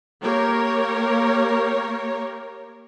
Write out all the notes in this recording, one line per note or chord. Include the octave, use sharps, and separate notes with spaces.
A#3 G4 A#4 C#5